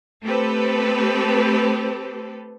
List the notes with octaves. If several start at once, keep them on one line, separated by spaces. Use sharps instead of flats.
A3 C4 G4 A4 B4